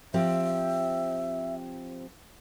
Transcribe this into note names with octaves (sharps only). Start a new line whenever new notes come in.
F3 C4 G4 E5